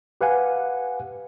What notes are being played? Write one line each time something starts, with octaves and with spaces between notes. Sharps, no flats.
G4 B4 F5 F#5 G#5